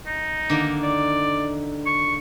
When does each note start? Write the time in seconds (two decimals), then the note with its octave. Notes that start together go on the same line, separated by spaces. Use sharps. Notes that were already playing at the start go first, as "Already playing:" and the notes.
0.07 D#4
0.50 D3 D#3 A#3
0.84 D5
1.86 C#6